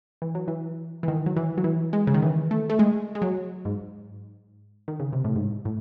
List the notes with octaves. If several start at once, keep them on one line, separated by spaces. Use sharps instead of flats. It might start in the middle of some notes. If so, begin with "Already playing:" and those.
E3
F#3
E3
E3
D#3
F#3
E3
F#3
E3
G#3
C#3
D#3
E3
A3
A3
G#3
G#3
F#3
G#2
D#3
C#3
C3
A2
G#2
A2